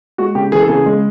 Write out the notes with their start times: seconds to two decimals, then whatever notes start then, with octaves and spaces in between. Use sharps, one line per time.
0.18 G#3 F#4
0.35 C#3 G4
0.52 E3 G#4
0.61 A4
0.68 C#3 G#4
0.86 G#3